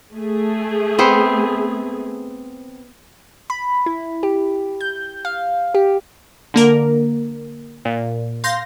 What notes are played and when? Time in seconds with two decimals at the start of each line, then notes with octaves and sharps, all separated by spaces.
0.13 A3 G#4
0.99 B3 C4 C5
3.50 B5
3.86 E4
4.23 G4
4.81 G6
5.25 F5
5.74 G4
6.54 D3 A#3 A#4
7.85 A#2
8.44 F5 C6 G6 A#6